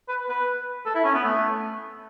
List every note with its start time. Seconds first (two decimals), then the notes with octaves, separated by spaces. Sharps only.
0.08 B4
0.28 B4
0.85 A4
0.95 E4
1.04 C#4
1.14 B3
1.24 A3